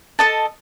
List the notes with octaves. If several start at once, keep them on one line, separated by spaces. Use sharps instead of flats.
A4 D#5 A5